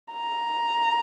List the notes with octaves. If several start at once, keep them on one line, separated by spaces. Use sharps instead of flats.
A#5